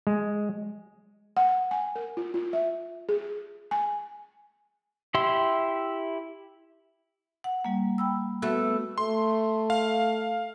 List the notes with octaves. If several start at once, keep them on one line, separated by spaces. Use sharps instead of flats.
G#3
F#5
G#5
A#4
F4
F4
E5
G#4
G#5
E4 G4 E5 C6
F#5
G3 A#3
G5 B5 E6
A3 B3 F#4 B4
A3 C6
F5